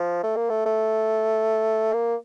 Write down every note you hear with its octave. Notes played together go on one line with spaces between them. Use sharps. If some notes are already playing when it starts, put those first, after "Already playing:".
Already playing: F3
A3
A#3
A3
A3
A#3